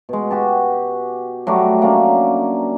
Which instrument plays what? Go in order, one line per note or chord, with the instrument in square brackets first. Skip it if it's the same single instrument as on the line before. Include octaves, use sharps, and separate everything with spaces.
[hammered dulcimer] B2 G#3
F#4 G4 A5
F#3 G3 A3 D6
A#3 C#4 D4